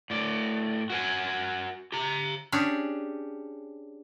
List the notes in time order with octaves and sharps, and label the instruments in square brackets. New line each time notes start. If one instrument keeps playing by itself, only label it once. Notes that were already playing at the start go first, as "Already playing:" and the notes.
[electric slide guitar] A2 D5
F#4 A#4 G#5
G4 A#5
[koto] C#4 D4 G4 G#4